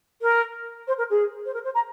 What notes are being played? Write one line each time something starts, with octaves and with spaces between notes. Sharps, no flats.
A#4
C5
A#4
G#4
C5
A#4
C5
A#5